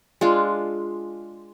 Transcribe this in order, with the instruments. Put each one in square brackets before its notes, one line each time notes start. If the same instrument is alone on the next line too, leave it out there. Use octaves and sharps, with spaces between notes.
[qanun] G#3 D4 F4